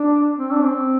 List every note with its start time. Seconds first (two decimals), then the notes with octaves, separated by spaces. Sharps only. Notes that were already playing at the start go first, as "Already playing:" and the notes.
Already playing: D4
0.38 C4
0.52 D4
0.65 C4